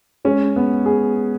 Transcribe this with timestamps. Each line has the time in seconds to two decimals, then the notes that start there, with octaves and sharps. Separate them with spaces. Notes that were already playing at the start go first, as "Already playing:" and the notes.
0.25 G#3 C#4
0.56 B3
0.86 G#4